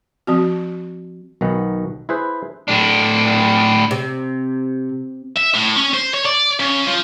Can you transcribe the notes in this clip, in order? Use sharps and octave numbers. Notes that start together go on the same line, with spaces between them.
F3 C4 F#4
B1 D#3 B3 F#4
E4 G#4 B4 C5
A2 D4
C3
E5
A2
C#4
C5
C#5
D5
C#3
F3